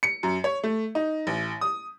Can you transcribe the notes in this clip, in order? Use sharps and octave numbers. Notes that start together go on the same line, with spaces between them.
C#7
F#2
C#5
A3
D#4
A1
D#6